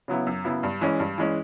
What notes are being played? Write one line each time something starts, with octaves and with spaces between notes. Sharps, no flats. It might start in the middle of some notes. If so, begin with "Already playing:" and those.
C#3 F#3 B3 E4
F#2
C#3 F#3 B3 E4
G2
E3 G#3 C#4
G2
E3 G#3 C#4